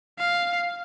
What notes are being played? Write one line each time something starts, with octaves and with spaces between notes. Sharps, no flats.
F5